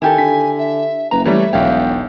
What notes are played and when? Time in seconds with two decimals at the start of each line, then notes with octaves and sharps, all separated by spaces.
0.02 D#3 E4 G4 A4 G#5
0.18 D3 B6
0.58 E5
1.11 F#1 B4 A#5
1.25 E3 G3 A3 C#5 E5
1.53 E1 B1 C#5 F5 G5